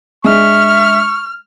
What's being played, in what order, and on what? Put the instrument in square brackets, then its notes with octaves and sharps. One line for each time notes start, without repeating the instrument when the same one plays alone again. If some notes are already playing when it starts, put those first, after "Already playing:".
[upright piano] G#3 D4 [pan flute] E5 [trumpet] C#6 [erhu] F6